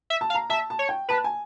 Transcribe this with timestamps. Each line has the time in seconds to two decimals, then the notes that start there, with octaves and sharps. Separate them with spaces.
0.10 E5
0.21 A5
0.30 F5
0.35 A#5
0.50 E5 A5
0.70 A5
0.79 C#5
0.89 G5
1.09 B4 A5
1.24 G#5